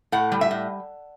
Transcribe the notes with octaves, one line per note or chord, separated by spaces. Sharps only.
A2 F#5
G3
E5
A2